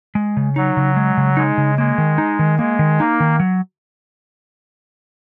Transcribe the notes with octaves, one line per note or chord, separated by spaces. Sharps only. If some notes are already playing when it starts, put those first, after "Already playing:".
G#3
C#3
F#3 D#4
C#3
G#3
C#3
G#3 D#4
C#3
G#3 A#3
D#3
D#4
D#3
G#3 A#3
D#3
A#3 D#4
D#3
F#3